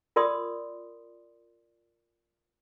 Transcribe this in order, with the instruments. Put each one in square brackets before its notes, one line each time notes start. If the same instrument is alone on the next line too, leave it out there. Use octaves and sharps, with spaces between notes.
[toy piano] F4 A#4 D5 C6 D#6